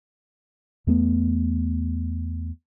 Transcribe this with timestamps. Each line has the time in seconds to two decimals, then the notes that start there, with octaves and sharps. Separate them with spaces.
0.87 E2 A3 B3